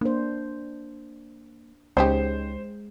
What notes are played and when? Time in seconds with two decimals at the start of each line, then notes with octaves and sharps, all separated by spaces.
0.01 A#3 D4 C5
1.97 C#2 G#3 C#4 D#4 G4 C5